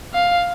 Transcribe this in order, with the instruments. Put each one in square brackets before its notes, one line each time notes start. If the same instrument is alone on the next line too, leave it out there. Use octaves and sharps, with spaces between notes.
[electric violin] F5